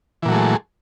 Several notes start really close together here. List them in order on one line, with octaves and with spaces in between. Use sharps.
E3 A#2 F#3 A3 G#3